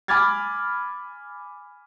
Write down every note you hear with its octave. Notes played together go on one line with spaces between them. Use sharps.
G#5 B5 D6 F6 G#6 A6